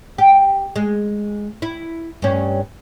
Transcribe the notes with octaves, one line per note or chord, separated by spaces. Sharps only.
G4
G#3
E4
G2 C#4